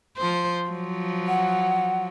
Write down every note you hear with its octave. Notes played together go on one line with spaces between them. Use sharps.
F3 C5
F3 F#3
F#5